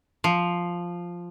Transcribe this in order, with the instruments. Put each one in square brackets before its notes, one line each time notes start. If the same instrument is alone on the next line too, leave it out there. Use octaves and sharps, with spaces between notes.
[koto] F3